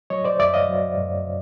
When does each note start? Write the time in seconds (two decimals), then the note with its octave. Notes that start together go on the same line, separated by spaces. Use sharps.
0.10 F#3 C#5 D#5
0.24 C5 D5
0.39 F#2 D5 E5
0.54 D#5 F5
0.69 F#3
0.98 F#2